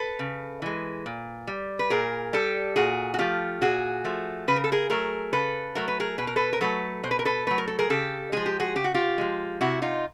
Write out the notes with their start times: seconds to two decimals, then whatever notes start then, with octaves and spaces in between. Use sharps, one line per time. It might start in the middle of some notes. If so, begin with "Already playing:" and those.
Already playing: A4 B4
0.19 C#3
0.62 E3 G#3
1.06 A#2
1.47 G3
1.79 B4
1.90 A#2 G#4 A#4
2.33 G3 G4 A4
2.76 A#2 F#4 G#4
3.14 F#4
3.18 F3 A3 F4 G4
3.61 A#2 F#4 G#4
4.04 F3 A3
4.48 C#3 B4
4.56 A#4
4.64 A4
4.72 G#4 A#4
4.90 F#3 A3 G#4 A#4
5.33 C#3 A4 B4
5.75 F#3 A3 A#4
5.88 B4
6.00 G#4 A#4
6.18 B2 B4
6.27 A#4
6.36 A4 B4
6.53 A#4
6.61 F#3 A3 A4 B4
7.03 B2 C5
7.11 B4
7.19 A#4
7.25 A4 B4
7.47 F#3 A3 B4
7.58 A#4
7.68 A4
7.79 G#4 A#4
7.90 C#3 G4 A4
8.32 F3 G#3 G#4
8.46 G4
8.60 F#4 G#4
8.75 C#3 G4
8.84 F#4
8.94 F4 G4
9.18 F3 G#3
9.61 C3 E4 F#4
9.82 D#4 F4